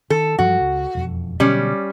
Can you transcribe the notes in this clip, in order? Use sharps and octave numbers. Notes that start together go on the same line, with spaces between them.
D#3 A4
G2 F3 F#3 F#4
C#2
E1 F2
B2 D3 F#3 G3 C#4